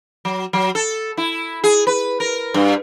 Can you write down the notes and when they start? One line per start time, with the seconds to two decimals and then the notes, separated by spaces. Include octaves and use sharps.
0.25 F#3
0.53 F#3
0.75 A4
1.17 E4
1.64 G#4
1.87 B4
2.20 A#4
2.54 G2